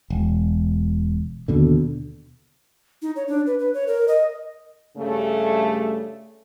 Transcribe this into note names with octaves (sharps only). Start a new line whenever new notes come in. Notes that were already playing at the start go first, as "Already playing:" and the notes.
E1
D#2 B2 D3
D#4
C#5
D4
B4
B4
C#5
A#4
D#5
G2 C#3 G3 A3